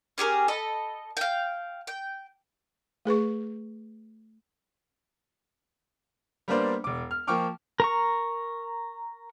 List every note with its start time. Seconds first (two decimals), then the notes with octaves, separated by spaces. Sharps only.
0.18 C#4 G4 G#4 A#4
0.48 A4 D#5 B5
1.17 F5 G5
1.87 G5
3.05 A3 G#4 B4 C#6
6.48 G3 A#3 B3 D4 C5 D5
6.84 E1 D6
7.11 F6
7.27 F3 A#3 G5 C#6 D6 F6
7.80 A#4 A#5 C#6